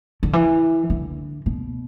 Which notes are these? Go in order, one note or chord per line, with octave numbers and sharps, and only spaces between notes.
D3
E3
D3
B2